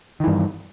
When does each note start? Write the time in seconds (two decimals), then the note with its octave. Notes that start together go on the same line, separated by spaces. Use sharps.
0.20 D#3
0.24 E3
0.27 G2